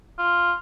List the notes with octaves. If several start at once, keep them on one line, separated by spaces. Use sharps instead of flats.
F4